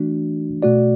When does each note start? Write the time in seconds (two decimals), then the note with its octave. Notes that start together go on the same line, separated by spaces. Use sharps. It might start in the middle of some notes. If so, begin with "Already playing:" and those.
Already playing: E3 A3 D4 F#4
0.62 B2 A3 F#4 D5